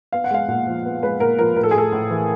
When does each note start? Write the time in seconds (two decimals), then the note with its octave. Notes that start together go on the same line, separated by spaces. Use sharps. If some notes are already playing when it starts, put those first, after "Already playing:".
0.12 B3 F5
0.24 F#5
0.31 G#3 F5
0.48 A#2 F#5
0.67 F3
0.85 B3
1.03 G#3 B4
1.20 A#2 A#4
1.38 F3 A#4
1.56 A2 A#4
1.63 A4
1.71 G#4
1.75 A3 A4
1.92 A2
2.10 E3